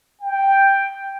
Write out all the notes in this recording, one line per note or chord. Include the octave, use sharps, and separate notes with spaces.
G5